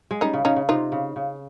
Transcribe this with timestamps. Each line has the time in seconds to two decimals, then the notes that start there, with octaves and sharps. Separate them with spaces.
0.11 G#3
0.21 G3 C#4 D#4
0.34 C#3
0.45 C#3 C#4 D#4
0.56 C#3
0.69 C3 D#4 F4
0.92 C#3
1.16 C#3